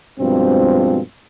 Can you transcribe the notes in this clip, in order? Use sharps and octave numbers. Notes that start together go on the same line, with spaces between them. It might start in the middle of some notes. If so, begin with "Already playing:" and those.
G2 B2 F3 G#3 C4